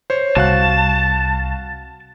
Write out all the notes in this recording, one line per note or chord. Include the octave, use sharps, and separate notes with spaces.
C5 C#5
C2 F#4 F5 A5 F#6